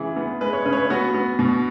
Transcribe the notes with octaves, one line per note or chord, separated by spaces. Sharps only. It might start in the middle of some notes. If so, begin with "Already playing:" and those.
Already playing: C#3 E3 G#3 G#4
B3
G#3 B4
C#5
C#3 B4
C#5
B4
B3 F#4
B3
B2